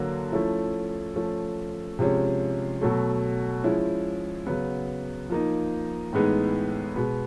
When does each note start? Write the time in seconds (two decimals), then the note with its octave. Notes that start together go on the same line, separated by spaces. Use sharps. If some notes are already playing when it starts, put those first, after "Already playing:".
Already playing: D3 F#3 A#3
0.32 F3 A3 C#4 E4
1.16 F3 A3 C#4
1.99 C3 F3 G#3 C#4
2.81 B2 F#3 A3
3.64 F3 G#3 C#4 E4
4.47 C#3 F#3 B3
5.30 F3 A#3 D#4
6.13 A2 E3 G#3 B3 D#4
6.96 B2 G#3 B3